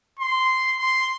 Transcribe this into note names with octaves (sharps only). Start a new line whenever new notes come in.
C6
C6